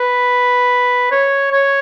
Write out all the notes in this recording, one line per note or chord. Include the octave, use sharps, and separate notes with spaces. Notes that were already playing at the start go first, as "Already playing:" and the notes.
Already playing: B4
C#5
C#5